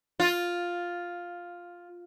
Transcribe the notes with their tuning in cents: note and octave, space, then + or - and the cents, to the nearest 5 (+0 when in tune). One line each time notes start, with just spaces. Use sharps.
F4 +5